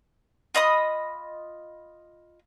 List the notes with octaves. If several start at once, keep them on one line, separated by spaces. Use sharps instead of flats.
F4 D#5 B5 D#6